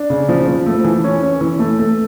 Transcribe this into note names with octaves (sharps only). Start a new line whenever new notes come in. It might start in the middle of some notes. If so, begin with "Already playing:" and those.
Already playing: D4
C#3
F3
F3
A3
E3
C#4
C#4
E3
A3
A3